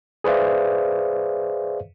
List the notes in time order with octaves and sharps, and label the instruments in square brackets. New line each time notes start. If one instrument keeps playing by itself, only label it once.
[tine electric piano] G#4 B4 C5 D5 E5 F5